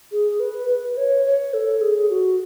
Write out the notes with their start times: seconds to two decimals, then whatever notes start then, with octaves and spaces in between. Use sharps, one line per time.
0.12 G#4
0.40 B4
0.68 B4
0.97 C#5
1.25 C#5
1.54 A4
1.81 G#4
2.10 F#4